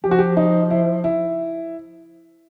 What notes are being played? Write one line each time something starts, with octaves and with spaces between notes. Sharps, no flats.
F3 G4
F#4
G4
D#4
E4
E4